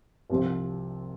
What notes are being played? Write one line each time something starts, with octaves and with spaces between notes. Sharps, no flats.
C2 C3 F3